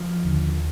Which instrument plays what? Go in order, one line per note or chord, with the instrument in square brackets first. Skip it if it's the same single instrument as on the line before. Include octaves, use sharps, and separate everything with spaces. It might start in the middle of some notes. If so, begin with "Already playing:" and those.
Already playing: [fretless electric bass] F3
D#2 D3